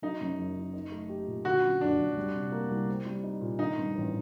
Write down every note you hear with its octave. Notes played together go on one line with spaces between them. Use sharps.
F#3 D#4
F#2
F#1
F#1
D#4
A3
G4
A#2
D3 F#4
F#2
F#1 D4
F#1
G3
C3
A#3
C2
C4
G3
D#4
A#2
D#3 D#4
G2
A1